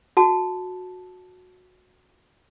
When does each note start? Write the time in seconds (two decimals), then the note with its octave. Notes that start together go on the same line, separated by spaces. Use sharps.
0.17 F#4 A5